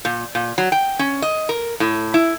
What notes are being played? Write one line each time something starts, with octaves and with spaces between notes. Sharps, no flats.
A#2
A#2
F#3
G5
C#4
D#5
A#4
A2
E4